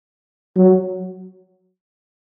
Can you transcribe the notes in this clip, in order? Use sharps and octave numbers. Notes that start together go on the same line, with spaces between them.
F#3